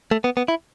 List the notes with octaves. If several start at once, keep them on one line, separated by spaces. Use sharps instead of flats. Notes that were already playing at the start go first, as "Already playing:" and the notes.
A3
B3
B3
E4